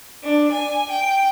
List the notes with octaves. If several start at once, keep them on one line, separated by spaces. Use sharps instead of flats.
D4
G#5
G5